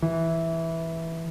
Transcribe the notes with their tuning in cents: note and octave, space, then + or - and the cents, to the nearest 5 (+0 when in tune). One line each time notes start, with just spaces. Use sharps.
E3 -5